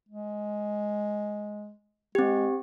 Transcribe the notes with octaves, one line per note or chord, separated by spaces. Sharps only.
G#3
G#3 C4 G4